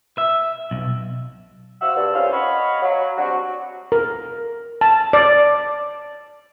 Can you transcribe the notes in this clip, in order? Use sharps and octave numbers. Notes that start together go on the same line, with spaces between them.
E5
B1
F#4 C5 F5 F#5 E6
G2
C2 C#4 F4 C5 F5
C#5 D#5 F5 F#5 B5
F#3
G3 C4 D4 F#4
A#4
A5
D5